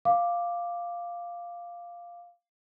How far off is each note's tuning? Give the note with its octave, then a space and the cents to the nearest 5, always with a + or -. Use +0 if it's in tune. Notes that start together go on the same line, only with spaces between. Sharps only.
F5 +0 D6 +0